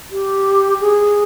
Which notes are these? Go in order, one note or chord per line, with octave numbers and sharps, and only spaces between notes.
G4
G#4